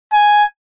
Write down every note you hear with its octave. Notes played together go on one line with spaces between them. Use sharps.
G#5